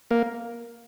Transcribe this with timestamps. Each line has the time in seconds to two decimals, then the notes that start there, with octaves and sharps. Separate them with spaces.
0.11 A#3